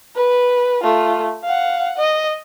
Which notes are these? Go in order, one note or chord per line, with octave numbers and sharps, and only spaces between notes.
B4
A3 F4
F5 F#5
D#5